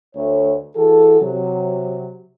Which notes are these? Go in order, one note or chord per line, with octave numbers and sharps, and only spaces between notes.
D2 A3 C#5
E3 F#4 G#4 A4
C3 F#3